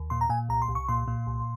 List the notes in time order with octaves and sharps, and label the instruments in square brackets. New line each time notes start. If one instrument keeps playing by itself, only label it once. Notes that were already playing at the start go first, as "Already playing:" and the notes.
Already playing: [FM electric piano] D#2
A#2 C6
A#5
A#2 G#5
C2 A#5
C6
C2
C#6
A#2 C6
A#2
C2